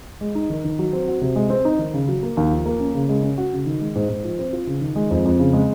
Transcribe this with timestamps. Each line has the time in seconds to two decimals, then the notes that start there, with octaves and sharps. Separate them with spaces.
0.21 G#3
0.35 D#4
0.50 D#3
0.65 D#3
0.79 F#3
0.93 C4
1.08 F#4
1.22 C3
1.36 G#3
1.50 C4
1.65 D#4
1.79 D#3
1.94 C#3
2.08 F#3
2.23 A#3
2.37 D#2
2.51 F3
2.66 A#3
2.80 C#4
2.94 C#3
3.09 G#3
3.23 C#4
3.38 F#4
3.53 C#3
3.66 D#3
3.81 G#3
3.96 G#2
4.09 G#2
4.24 F3
4.39 C4
4.53 F4
4.67 C#3
4.81 D#3
4.96 G#3
5.10 F2
5.25 F2
5.39 C#3
5.53 G#3